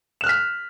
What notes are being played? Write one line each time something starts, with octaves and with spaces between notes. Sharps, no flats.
F6 F#6 B6 E7